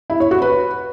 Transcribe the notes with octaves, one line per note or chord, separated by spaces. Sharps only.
E4
C#5
F#4
B4